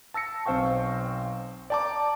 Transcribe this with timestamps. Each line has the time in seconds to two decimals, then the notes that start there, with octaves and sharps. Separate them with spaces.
0.14 A5 E6 A#6 C#7
0.46 B1 C4 C5 F5 G5 C#6
1.70 D5 G5 A5 A#5 D6